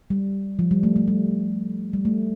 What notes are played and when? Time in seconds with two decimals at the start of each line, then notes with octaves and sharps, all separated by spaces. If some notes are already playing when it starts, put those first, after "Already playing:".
0.10 G3
0.59 F3
0.71 G3
0.83 A3
0.96 A3
1.08 G3
1.93 G3
2.05 A3